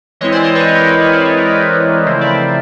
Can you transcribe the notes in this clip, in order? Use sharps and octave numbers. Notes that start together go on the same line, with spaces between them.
E3 G#3 C4 E4 C#5 D#5
C5 D5
C#5 D#5
B4 C#5
B4
A#4
B4
B4 C#5
C5 D5
B4 C#5
A#4
B4
C#3 F3 A3 C4 E4 A#4 C5
D5 E5
C5 D5